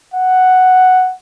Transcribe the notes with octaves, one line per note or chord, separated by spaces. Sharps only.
F#5